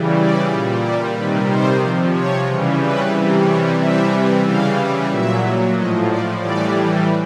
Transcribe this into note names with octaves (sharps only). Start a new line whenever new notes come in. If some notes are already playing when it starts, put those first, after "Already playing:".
Already playing: C#3 E3 G3
D5
A#2 G3
D5
C3 D#3 G3 B4
C5
C3 F3
C#5
C#3 E3 G3
B4
C3 E3 G3
C#5
C3 E3 G3 E5
C#3 E3 G3 F5
A#2 F#3 E5
A2 F3 D#5
D5
A2 E3 G3 D5